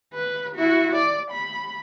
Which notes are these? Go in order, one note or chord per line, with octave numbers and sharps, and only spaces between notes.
B4
E4 F#4
D5
B5